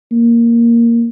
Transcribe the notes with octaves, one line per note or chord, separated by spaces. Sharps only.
A#3